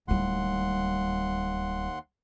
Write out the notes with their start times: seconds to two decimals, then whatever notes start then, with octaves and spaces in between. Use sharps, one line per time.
0.08 D1 D#2 G3 F#5 C6